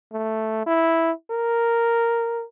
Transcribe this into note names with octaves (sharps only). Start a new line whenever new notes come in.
A3
E4
A#4